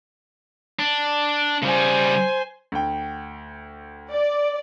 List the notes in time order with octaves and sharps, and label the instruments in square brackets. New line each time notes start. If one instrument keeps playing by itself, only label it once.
[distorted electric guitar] D4
[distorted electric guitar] C#3 G3 [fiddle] C5 G#5
[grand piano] D2 G5
[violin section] D5